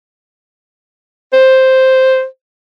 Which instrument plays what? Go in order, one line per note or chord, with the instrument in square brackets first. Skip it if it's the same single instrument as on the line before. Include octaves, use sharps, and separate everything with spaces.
[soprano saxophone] C5